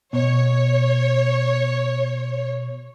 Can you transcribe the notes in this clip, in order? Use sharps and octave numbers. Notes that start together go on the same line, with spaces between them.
B2 C#5